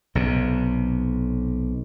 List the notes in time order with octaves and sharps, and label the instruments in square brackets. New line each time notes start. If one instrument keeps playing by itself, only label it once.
[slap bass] B1 C3